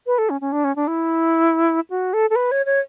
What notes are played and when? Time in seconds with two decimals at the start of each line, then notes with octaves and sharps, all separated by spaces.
0.07 B4
0.18 A4
0.30 C#4
0.41 C#4
0.52 D4
0.64 C#4
0.76 D4
0.88 E4
1.90 F#4
2.13 A4
2.30 A4
2.36 B4
2.52 C#5
2.66 C#5